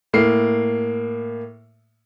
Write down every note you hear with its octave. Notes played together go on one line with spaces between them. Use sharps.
A2 A#3 C7